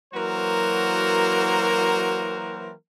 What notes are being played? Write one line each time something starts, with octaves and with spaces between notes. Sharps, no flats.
E3 F#3 A#3 F#4 A#4 C5